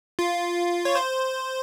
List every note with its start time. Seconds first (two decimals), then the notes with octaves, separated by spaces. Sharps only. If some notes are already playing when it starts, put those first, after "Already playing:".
0.19 F4
0.85 C#5
0.95 C5